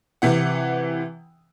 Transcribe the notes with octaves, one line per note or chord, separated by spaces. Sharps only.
C3 E3 F#5